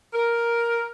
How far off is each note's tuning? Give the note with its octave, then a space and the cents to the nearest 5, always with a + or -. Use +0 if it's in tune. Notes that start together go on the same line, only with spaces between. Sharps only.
A#4 +5